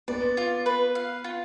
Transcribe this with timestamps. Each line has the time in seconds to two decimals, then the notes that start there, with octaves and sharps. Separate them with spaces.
0.08 B3 D5
0.37 F4
0.66 B4
0.95 F5
1.24 F4